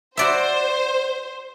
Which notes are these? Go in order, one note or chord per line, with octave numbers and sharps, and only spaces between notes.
F#4 C5 D5 E5